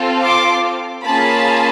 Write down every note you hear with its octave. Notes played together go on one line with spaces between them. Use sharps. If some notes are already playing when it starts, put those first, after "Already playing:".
Already playing: C4 F4 A4
C6 D6
A#3 C#4 F4 G#4 A5 B5